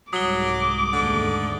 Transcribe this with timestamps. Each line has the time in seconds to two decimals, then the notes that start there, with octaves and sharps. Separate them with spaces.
0.13 C2 G#2 F#3 D6 D#6 G7
0.93 D#2 G#2 D3 A3